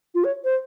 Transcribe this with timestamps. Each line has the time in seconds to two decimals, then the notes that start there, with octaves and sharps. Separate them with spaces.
0.15 F4
0.24 C#5
0.44 C5